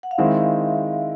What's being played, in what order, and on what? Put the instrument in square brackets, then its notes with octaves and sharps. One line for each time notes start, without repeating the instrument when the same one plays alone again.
[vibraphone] F#5
F5
[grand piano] D#3 G#3 C4 E4 [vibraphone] E5